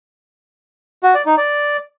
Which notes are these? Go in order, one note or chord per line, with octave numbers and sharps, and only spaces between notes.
F#4
D5
D#4
D5